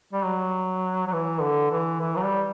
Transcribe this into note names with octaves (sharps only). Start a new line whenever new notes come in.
G3
F#3
F#3
E3
D3
E3
E3
F#3
G3